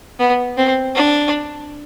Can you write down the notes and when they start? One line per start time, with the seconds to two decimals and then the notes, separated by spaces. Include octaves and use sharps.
0.19 B3
0.57 C4
0.95 D4